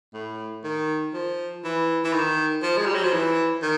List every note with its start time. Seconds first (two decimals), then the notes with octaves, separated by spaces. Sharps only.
0.14 A2
0.64 D#3
1.14 F3
1.64 E3
2.04 E3
2.13 D#3
2.62 F3
2.77 G#3
2.85 G3
2.94 F#3
3.04 F3
3.13 E3
3.62 D#3